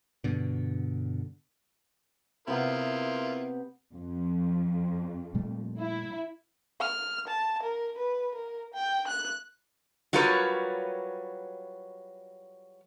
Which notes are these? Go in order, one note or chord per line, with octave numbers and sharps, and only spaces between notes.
G2 B2 D3
C3 B3 E4 F4 A#4
F2
A#2 G3 A3
E4
F6
A5
A#4
B4
A#4
G5
F#6
F#3 G3 F4 A#4 B4 C#5